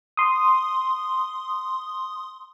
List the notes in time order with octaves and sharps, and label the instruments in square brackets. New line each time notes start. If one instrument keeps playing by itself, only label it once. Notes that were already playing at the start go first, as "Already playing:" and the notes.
[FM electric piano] C6 D#6